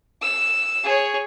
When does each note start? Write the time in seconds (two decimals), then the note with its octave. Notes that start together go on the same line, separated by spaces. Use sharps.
0.22 E6
0.84 G#4 C#5